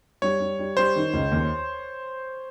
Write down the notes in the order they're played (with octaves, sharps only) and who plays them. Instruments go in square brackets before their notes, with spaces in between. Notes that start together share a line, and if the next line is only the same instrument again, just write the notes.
[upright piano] G3 [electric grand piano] C#5
[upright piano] G3
G3
[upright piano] G3 [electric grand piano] C5
[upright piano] D#3
C#2
D#2